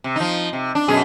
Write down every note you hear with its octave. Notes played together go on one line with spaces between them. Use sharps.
C3
F3 D#4
C3
D4
F#2 B2 G#4